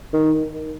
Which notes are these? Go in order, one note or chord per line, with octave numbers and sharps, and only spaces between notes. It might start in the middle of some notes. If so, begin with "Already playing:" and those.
D#3